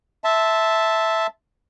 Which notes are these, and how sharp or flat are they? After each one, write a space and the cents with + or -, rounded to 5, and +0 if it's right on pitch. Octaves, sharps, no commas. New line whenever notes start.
E5 -5 A5 +0 C6 -10